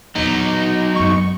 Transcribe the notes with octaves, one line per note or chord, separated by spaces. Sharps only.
A#1 E2 B2 F#3 D#4
G#1 F#2 C#6